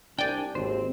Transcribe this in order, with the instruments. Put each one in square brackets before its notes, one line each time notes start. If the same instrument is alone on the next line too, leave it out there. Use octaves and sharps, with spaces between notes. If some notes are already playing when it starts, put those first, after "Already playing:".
[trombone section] C2 [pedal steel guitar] D4 G#5 [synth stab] D5 G5
[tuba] G#1 [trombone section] D#2 [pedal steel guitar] C4 C5